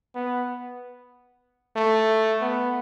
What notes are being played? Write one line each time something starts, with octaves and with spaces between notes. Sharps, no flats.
B3
A3
B3